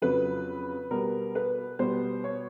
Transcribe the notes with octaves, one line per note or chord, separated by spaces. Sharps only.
F2 C#3 F#3 B4
B2 G3 B3 A#4
B4
B2 G3 B3 C5
C#5